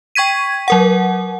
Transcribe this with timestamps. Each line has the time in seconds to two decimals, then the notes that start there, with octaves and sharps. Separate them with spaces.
0.15 G5 C#6 G#6 B6 D#7
0.68 F#3 A#4 F#5